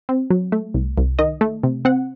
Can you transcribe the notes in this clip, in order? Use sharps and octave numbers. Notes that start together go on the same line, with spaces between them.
C4
F#3
A3
C2
C2
D#3 D#5
A3
C3
C4 F#5